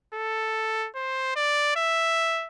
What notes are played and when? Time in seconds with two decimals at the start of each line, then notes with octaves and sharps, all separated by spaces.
0.14 A4
0.95 C5
1.36 D5
1.76 E5